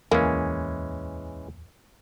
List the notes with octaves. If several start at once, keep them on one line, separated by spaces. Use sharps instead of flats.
D1 E2 E3 G#3 A#3 C#4